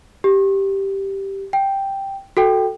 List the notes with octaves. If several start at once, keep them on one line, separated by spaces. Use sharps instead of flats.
G4
G5
F#4 A4 G5